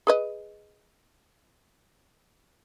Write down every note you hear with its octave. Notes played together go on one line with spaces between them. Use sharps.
G#4 B4 D#5